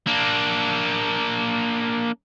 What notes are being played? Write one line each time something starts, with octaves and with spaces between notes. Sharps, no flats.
A#3 D4